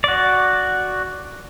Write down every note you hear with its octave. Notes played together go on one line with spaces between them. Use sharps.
F#4 D5